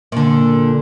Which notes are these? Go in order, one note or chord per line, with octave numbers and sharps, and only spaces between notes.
A#2 D3